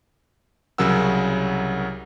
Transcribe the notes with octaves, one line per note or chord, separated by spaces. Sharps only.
C2 C#3 F#3 A#4 F#5 E6